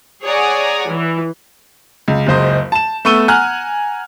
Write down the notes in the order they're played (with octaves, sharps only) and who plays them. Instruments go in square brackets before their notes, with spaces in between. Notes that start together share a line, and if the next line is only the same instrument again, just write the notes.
[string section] G#4 C#5 D5 F#5 G#5 A#5
E3
[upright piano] C#2
F#1 C#2 C5 D#5
A5 E7
A3 B3 C#6 E6 D#7 G7
F#5 G#5 A#5 F6 F#6